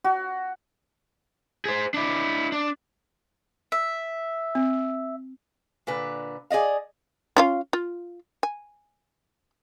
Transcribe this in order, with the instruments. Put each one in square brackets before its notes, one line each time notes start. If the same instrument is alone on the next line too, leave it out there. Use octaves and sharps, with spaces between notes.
[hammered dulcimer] F#4
[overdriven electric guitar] G#4 C5
D4 E4
D4
[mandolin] E5
[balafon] C4
[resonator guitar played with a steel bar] A#2 D3 B4
G#4 D5 D#5 F5
[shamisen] C#4 F4 F5
F4
G#5